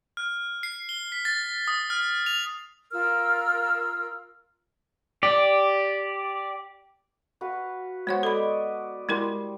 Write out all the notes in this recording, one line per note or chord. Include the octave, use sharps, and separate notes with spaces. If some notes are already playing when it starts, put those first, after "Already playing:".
F6
C7
G7
B6
A6
D#6
F6
F7
F4 A#4 E6 F6
G4 D5
F#4 B4 F5
G#3 B3 F#4 C5 C#5 F#5
A4 B4 D5 D#5 B5
G3 G#3 E4 A#4 C6